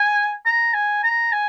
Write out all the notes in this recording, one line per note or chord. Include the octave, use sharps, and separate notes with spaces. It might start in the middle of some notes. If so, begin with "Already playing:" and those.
Already playing: G#5
A#5
G#5
A#5
G#5